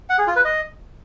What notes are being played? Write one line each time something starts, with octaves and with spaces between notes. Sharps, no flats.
F#5
G#4
F4
B4
D#5